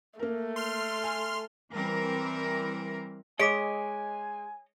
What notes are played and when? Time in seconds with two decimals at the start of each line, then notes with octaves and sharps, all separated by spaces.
0.19 A3 A#3 A#4
0.56 C6 F6
1.04 G#5
1.73 E3 G3 C4 A#4
3.40 G#3 C#5 D#5 G#5 D6 B6 D7